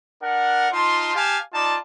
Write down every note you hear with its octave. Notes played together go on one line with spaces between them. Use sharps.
D4 A#4 F#5
D#4 F4 A5 C6
G4 F5 G#5 A5
D#4 F4 D5 A5